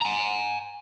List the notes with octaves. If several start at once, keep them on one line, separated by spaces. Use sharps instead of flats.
G#5 A#5